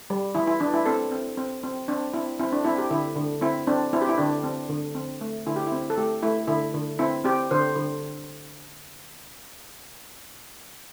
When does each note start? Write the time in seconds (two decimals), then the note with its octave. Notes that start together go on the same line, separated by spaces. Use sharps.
0.10 G3
0.35 E3 E4
0.47 E4
0.60 E3 D4
0.74 E4
0.86 C4 A4
1.11 C4
1.37 C4
1.63 C4
1.88 C4 D4
2.13 C4 E4
2.39 C4 E4
2.52 D4
2.64 C4 E4
2.78 G4
2.91 D3 E4
3.16 D3
3.41 C4 E4
3.67 C4 D4
3.93 C4 E4
4.02 G4
4.09 E4
4.18 D3 D4
4.44 C4
4.70 D3
4.95 C4
5.21 A3
5.47 D3 E4
5.56 G4
5.67 E4
5.72 C4
5.90 A4
5.98 A3 G4
6.23 A3 E4
6.48 D3 E4
6.74 D3
6.99 C4 E4
7.24 C4 G4
7.51 D3 C5
7.76 D3